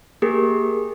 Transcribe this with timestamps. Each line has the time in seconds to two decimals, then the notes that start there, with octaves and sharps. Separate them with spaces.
0.22 A#3 G4 G#4 A#4